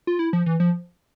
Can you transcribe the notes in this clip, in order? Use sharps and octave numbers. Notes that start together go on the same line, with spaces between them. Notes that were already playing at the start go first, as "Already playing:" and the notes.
F4
E4
F3
E3
F3